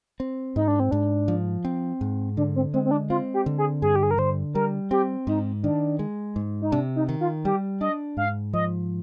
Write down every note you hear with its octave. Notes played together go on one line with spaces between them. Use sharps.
C4
G#2 D#4
D4
C4
G#2 D4
F3
C4
G#2
D3 D4
C4
G#3 C4
C4
D4
C4 F4
G4
D3
G#4
G2 G#4
G4
G#4
A#4
D3 C5
G3 A#4
C4 G4
G#2 D#4
D#3 D4
G#3
G#2
D#4
C3 D4
D#4
D#3
F4
G3 G4
D4 D#5
G#2 F5
F3 D#5